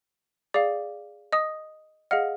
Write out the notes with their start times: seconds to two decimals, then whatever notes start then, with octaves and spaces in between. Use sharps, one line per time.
0.54 G#4 D5 F5 D6
1.33 D#5 D#6
2.11 G#4 D#5 F5 F#5 F6